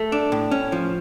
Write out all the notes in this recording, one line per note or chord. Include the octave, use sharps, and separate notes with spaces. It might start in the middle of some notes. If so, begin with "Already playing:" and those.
Already playing: A3
D4
A2
C#4
F3